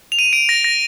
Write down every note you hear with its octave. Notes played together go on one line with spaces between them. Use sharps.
F7
D#7
D7
A#6
A#6